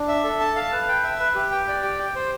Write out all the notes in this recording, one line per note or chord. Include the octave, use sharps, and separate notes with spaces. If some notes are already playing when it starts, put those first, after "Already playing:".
Already playing: D4
E5
A4
A5
F5
B4
G5
E5
B4
G4
G5
D5
G4
G5
C5